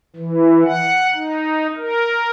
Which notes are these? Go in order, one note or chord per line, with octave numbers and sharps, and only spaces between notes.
E3
F#5
D#4
A#4